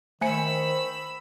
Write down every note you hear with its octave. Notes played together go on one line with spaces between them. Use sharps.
D#3 A3 C5 G#5 B5 E6 C#7